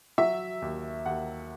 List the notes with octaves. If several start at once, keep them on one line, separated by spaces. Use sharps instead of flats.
F#3 E5
D#2
D#2 F#5